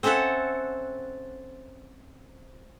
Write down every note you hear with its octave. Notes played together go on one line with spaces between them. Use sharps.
C4 C#4 A4 E5 F#5